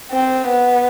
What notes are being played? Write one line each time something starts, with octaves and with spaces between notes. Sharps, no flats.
C4
B3